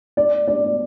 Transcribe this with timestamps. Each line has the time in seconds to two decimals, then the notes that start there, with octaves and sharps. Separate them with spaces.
0.17 D5
0.48 D5